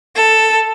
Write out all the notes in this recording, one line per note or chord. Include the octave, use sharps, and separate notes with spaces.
A4